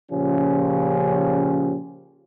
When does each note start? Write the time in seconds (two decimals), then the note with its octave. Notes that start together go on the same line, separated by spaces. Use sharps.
0.12 A#2 C#3 F3 C#4 G4